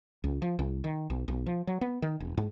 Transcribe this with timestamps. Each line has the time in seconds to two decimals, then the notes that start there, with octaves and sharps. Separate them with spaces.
0.24 C#2
0.42 F3
0.59 C2
0.84 D#3
1.10 B1
1.28 B1
1.46 F3
1.67 F#3
1.81 B3
2.02 D#3
2.20 E1
2.37 G#2